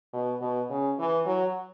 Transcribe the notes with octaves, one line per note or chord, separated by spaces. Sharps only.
B2
B2
C#3
E3
F#3